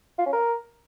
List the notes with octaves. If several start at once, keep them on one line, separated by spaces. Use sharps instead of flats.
F4
C#4
A#4